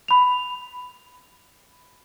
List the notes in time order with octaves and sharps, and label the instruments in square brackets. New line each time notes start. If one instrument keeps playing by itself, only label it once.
[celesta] B5 F7